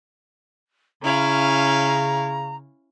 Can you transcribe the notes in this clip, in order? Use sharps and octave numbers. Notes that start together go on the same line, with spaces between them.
C#3 C#4 E4 F5 A#5